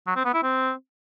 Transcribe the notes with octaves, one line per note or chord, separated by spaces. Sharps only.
F#3
C4
B3
E4
C4